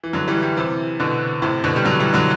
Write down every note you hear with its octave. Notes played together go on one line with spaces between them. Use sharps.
E3
D3 F#3
E3 G3
E3 G3
C3 E3
B2 D3
A2 C3
B2 D3
G3
D3 F#3
E3 G3
D3 F#3